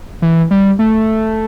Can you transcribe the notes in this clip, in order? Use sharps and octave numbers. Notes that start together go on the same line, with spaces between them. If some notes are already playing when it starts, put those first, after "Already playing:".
E3
G3
A3